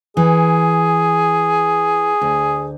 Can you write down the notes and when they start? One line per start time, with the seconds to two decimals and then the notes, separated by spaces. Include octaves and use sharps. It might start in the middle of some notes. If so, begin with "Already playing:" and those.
0.17 E3 G#4
2.21 D2